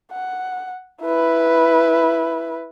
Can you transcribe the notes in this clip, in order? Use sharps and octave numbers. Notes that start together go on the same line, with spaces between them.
F#5
E4 B4